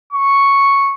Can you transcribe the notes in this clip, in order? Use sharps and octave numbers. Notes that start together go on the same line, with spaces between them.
C#6